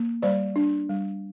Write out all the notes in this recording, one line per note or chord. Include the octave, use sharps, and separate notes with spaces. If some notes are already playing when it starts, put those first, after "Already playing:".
Already playing: A#3
G3 C5 D5
D4
G3